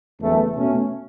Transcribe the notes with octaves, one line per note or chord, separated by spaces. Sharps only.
F#1 E2 E3 A3
B2 A3 C#4